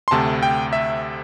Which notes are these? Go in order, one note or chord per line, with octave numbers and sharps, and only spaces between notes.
C6
D2 C3 A3 A5
G5
E5